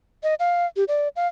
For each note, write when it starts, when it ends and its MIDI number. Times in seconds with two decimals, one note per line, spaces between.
0.23 0.34 75
0.40 0.66 77
0.76 0.84 67
0.88 1.08 74
1.16 1.27 77